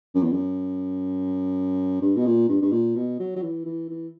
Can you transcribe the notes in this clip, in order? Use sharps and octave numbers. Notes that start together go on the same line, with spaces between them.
F#2
E2
F#2
G2
B2
A#2
G2
G2
A#2
B2
F#3
F#3
E3
E3
E3